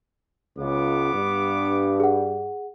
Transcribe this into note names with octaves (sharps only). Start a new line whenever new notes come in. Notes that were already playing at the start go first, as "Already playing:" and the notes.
C#2 B3 D6
G2
G#4 F#5